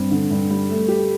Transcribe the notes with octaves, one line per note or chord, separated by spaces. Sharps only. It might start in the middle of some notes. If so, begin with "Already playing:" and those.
Already playing: G2 C4
D3
G2
G3
A3
G4